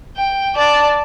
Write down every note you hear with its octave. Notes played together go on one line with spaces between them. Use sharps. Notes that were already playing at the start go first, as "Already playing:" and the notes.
G5
D5 A5